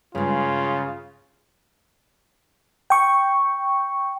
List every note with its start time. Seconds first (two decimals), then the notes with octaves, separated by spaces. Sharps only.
0.15 G2 C#3 G#3 F4
2.90 G5 C#6